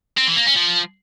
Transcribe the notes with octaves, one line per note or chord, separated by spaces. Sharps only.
C4
E3
A#3
C#4
F3